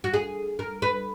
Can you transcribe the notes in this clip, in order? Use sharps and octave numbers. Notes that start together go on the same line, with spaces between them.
F#4
G#4
A#4
B4